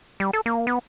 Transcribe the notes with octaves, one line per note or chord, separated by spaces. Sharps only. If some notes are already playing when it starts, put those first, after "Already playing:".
G3
A4
A#3
B3